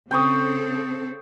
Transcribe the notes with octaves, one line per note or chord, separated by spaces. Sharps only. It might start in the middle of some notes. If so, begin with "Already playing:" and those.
C#3 C4 A4 G5 C#6 D#6